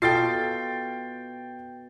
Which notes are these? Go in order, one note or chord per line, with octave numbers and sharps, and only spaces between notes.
B2 F4 A4 G5 A6 C7